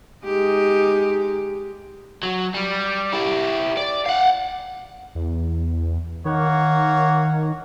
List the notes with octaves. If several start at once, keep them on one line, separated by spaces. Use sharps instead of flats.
G#3 D#4 G4
F#3
G3
E4 G4
D5
F5 F#5
E2
D#3 A#3 C#5 F#5